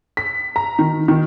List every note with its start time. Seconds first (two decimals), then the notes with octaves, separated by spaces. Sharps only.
0.17 B6
0.56 A#5
0.79 D#3
1.08 D#3